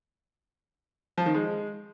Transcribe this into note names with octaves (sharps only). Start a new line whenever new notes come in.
F3
D#3
G#3